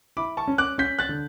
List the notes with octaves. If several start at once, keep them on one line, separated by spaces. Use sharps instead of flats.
E4 B5 D6
A5 C#6
C#4
D6 F#6
C#4 G6 B6
F#6 A6
D3